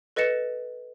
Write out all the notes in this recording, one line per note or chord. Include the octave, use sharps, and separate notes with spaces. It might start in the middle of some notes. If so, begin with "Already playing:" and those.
A4 B4 D#5 A6 C#7 E7